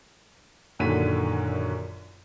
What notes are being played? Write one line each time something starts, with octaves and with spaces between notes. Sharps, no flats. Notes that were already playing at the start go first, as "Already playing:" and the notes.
A#1 F#2 D3 D#3 B6 D#7